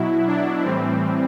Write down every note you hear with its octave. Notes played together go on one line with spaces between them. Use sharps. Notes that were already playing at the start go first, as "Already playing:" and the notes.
Already playing: B2 F#3 E4
D4
A2 E3 G3 C4